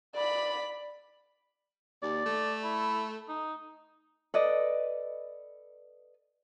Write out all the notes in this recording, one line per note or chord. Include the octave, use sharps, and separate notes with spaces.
D5 B5
D#2 D5
A3
E4
D#4
A4 B4 D5 D#5